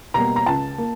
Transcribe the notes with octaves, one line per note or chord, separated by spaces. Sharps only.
B2 G3 A#3 A#5
A#5
C#2 A5
A#3